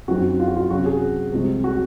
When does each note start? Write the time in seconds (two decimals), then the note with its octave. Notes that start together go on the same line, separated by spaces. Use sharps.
0.08 F#2 F3 C4 D#4 F#4
0.40 F4
0.48 F#4
0.57 F4
0.70 C3 F#3 C#4 F#4
0.86 G#4
1.32 C2 C3 F3 G#3 C4
1.64 F#4